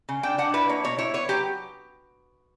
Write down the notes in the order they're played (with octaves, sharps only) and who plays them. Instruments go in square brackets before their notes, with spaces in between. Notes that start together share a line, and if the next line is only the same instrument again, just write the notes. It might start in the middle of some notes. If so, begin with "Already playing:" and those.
[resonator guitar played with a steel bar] C#3
D4 G5
D4 F#5
E4 B4
A#3 C#5
B2 C#5
E4 C#5
B3 C#5
F#3 G4